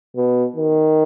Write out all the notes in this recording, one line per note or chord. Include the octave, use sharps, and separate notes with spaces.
B2
D#3